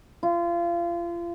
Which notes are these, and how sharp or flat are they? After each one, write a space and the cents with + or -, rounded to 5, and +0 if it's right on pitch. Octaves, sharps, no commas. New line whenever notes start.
F4 -30